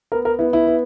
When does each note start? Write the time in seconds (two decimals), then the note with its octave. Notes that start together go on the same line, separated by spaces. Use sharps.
0.12 B3 A#4
0.25 A#4
0.39 B3 E4
0.53 E4
0.67 B3